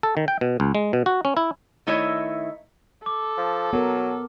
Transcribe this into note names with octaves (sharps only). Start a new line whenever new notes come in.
A4
D#3
G5
B2
C#2
G#3
B2
F#4
C#4
E4
D#3 A3 E4 C#5 D#5
A4 D6
F3
F#3 B3 A#4